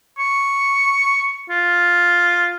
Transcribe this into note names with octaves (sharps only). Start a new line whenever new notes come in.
C#6
F4